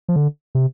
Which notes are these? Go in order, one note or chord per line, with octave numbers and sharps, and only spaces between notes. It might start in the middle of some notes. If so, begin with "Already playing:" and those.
F3
D3
C3